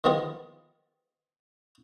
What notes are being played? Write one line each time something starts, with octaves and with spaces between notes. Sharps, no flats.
D#3 F3 B3 F4 G#4